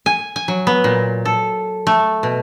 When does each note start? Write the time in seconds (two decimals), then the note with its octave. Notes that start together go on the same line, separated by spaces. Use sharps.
0.06 G#5
0.36 G#5
0.48 F#3
0.67 B3
0.84 A#2
1.25 A4
1.87 A3
2.23 B2